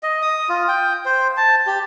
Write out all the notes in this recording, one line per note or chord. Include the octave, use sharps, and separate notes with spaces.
D#5
D#6
F4
G5
C5
A5
G4